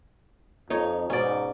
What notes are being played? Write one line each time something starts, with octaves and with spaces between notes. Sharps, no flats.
F2 D#4 C#5
G#2 B2 C#4 D5